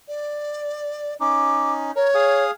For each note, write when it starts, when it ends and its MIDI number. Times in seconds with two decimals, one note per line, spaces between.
0.09 1.14 74
1.20 1.91 61
1.20 1.91 63
1.20 1.73 86
1.96 2.10 70
1.96 2.44 73
2.14 2.51 68
2.14 2.51 77
2.14 2.51 87